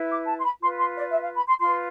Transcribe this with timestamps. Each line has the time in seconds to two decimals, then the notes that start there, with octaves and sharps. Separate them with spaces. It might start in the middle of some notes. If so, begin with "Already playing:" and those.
Already playing: E4 B4
0.11 D6
0.27 A5
0.38 C6
0.43 B5
0.60 F4 B4 C6
0.77 C6
0.94 D5
1.11 E5
1.22 F5
1.34 B5
1.47 C6
1.59 F4 B4 C6